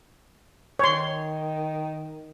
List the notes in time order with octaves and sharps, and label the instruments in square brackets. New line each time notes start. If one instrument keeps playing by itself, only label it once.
[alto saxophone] D#3 [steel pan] C#5 C6